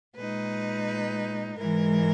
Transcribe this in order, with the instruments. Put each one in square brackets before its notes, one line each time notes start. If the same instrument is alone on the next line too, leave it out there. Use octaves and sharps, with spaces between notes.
[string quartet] A#2 G#3 D#4 B4
G#2 E3 G#3 A#4